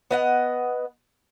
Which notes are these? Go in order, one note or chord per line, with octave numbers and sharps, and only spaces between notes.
B3 D#5 F#5